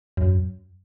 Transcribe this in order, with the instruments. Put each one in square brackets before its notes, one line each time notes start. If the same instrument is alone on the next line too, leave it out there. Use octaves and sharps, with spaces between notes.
[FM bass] F#2